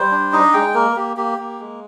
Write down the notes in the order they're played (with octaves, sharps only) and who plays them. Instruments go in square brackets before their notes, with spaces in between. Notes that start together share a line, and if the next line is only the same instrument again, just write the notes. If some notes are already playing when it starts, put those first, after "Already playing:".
Already playing: [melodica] G3 C5
D4
D#4 D#5
G#3 G5
A#3 A#4
A#3 G4
A#3 G4
A#3
G#3